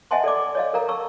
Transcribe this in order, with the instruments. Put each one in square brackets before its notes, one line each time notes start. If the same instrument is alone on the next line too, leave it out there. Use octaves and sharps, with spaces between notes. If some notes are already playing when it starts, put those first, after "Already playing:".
[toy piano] D#5 E5 F#5 G#5 A5 C6
A4 D5 D6
C#5 D#5 F5
A4 A#4 F5 A#5
A5 C#6 E6